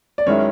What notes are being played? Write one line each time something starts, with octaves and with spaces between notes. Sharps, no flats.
D5
F#2 D#3 G#3 C#4 E4 C#5